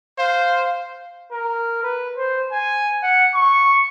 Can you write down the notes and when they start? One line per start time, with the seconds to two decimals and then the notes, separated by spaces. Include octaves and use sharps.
0.18 C5 F5
1.32 A#4
1.83 B4
2.17 C5
2.52 G#5
3.03 F#5
3.35 C#6